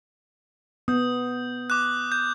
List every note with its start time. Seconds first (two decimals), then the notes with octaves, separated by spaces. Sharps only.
0.88 B3 D#6 G6
1.70 D6 F#6
2.12 G6